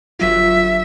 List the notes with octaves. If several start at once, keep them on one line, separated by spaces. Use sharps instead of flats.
G1 F#3 F4 E5